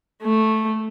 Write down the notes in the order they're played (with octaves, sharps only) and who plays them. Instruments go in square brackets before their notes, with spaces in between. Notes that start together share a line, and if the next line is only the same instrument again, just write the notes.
[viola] A3